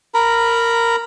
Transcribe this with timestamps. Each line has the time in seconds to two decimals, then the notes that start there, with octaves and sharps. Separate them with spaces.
0.14 A#4 A#5 B5